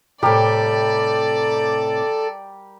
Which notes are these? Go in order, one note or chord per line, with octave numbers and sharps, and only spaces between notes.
A2 C3 G3 G4 A4 A#4 D5